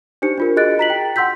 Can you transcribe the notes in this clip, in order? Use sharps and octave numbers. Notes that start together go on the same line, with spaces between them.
D4 D#4 G4 C5 C#7
D4 F4 A#4
F#4 G#4 D#5 F#6 A6 D7
F4 A#5 B6 F#7
G5
F#5 C6 E6 G6 B6